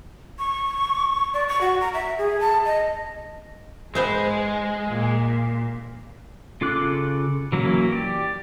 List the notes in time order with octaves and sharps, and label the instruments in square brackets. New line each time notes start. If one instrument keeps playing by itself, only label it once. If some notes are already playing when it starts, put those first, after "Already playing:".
[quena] C#6
D5
C#6
F#4
A#5
E5
G#4
A5
D#5
[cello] G#2 G#4 [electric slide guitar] G#3 [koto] B3 C5 E5
[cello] A#2
[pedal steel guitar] C#3 F4 A4 D6 F#6
E3 F#3 A#3 C#4 E4
G4 D5